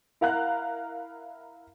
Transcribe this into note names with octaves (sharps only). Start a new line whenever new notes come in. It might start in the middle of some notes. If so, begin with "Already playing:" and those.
E4 A#4 F5 F#5 A#5 F#6